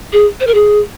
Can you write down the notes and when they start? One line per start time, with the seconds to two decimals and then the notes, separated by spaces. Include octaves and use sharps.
0.13 G#4
0.40 C5
0.47 A#4
0.54 G#4